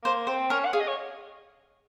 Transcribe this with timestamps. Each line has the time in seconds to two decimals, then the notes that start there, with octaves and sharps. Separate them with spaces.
0.04 A#3 C5
0.27 C4 C5
0.50 C#4 A#4
0.66 F#5
0.73 G#4 F5
0.80 D#5
0.88 C#5